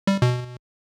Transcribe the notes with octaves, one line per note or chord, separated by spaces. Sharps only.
G3
B2